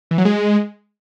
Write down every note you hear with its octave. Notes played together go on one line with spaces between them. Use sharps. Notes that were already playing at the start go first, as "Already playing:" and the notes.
E3
F#3
G#3